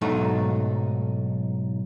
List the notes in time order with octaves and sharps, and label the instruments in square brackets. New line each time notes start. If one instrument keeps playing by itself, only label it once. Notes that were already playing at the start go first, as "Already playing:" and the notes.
[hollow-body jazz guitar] B1 G#2 F#3 A3 D#4